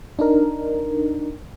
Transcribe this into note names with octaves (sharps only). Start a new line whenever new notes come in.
D4 D#4 A#4